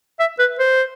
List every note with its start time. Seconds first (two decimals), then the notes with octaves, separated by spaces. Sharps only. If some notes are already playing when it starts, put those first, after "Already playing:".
0.20 E5
0.39 B4
0.59 C5